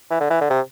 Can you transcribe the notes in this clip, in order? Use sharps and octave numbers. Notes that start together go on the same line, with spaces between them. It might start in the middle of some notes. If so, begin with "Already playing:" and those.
E3
D3
E3
D3
C3